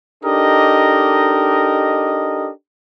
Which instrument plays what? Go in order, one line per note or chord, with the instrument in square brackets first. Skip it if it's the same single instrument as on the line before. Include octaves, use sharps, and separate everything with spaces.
[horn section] D4 D#4 G4 A4 A#4 D#5